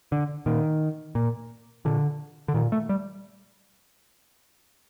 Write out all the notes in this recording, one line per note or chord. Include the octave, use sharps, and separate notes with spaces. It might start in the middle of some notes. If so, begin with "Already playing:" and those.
D3
A#2 D#3
A#2
A#2 D3
D3
A#2 D#3
A3
G3